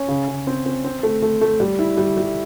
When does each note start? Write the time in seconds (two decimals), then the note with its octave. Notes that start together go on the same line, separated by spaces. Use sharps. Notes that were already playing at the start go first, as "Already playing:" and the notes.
Already playing: C#4
0.08 C#3
0.28 C#3
0.47 C4
0.66 C4
0.84 C4
1.03 A3
1.22 A3
1.41 A3
1.60 G3
1.79 E4
1.97 G3
2.17 G3